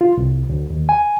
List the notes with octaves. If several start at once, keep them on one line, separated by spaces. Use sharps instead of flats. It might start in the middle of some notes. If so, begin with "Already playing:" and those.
F4
C2
D2
D#2
G#5